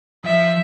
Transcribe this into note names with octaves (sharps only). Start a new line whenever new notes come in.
F3 E5